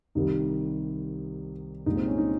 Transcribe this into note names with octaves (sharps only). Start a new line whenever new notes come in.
C2 C3 D#3 G3 D#4
C2 A#2 G#3 D#4
C4
C#4
D#4